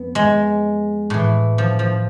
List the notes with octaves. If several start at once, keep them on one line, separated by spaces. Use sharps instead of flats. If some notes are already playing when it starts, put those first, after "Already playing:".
Already playing: F2 B3
G#3
A2 E3
F3
F3